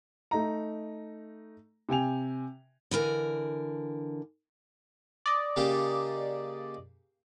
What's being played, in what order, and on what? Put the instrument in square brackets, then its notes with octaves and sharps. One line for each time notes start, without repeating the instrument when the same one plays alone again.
[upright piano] A3 D#4 A#5
C3 G5 G#5 F7
[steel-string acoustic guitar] D3 E3 A#4 G#5
[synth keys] D5 D#5
[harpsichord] C#3 A#3 G4